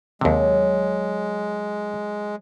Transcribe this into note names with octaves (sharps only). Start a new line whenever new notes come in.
D#2 C3 F#3 G#3